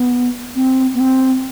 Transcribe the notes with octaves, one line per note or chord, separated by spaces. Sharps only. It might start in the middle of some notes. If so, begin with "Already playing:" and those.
Already playing: B3
C4
B3
C4